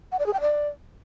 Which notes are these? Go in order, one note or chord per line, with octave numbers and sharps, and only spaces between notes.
F#5
D5
G#4
G5
D5